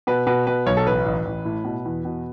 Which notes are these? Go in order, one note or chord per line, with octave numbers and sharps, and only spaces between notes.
B2 B4
B2 B4
B2 B4
B1 C#5
A4
A1 B4
A1
A1
A2
B2
E2
B2